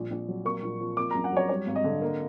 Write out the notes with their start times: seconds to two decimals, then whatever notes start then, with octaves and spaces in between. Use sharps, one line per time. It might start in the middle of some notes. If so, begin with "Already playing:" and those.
Already playing: A#1
0.11 A#1
0.28 F#3
0.45 A#3 C#6
0.63 A#1
0.80 F3
0.97 A#3 D6
1.11 A#5
1.15 F#2
1.24 F#5
1.32 F#3 C#5
1.49 G3 C#5
1.67 G#1
1.76 D#5
1.84 D3
2.02 A#3